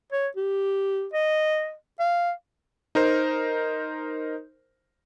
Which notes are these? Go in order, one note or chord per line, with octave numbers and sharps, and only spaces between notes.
C#5
G4
D#5
F5
D#4 A#4 C5